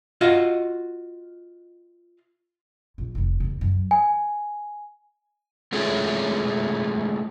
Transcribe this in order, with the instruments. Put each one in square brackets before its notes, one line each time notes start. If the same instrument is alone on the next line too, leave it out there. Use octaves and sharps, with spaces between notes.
[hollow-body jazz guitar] F4 F#4 D#5 F5
[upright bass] A#1
F1 D#2
E2 C#3
F#2
[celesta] G#5
[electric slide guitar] G#3 A3 C#4 E4 F4 G#4